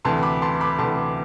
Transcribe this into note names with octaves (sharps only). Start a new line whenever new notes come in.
D2 C3 E3 A5 C6
B5 D6
A5 C6
B5 D6
D2 C3 E3 A5 C6